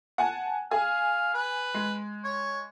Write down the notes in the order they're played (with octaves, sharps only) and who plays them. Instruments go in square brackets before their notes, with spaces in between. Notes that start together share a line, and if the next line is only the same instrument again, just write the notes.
[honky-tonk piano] F#5 G#5 A5
[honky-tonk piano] G#4 [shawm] F5
[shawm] B4
[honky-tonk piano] G#3
[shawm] C#5